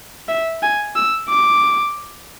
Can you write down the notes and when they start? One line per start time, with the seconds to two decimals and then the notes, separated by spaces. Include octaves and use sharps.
0.28 E5
0.62 G#5
0.96 E6
1.29 D6